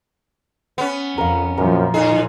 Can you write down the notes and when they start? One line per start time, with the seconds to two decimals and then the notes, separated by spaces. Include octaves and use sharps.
0.78 B3 C#4
1.18 F2 A#4 F5
1.57 F#2 A#2 F3 A#4
1.94 A2 D#4 G#4